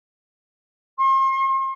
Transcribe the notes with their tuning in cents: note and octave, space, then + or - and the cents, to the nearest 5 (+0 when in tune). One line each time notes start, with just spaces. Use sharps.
C6 +40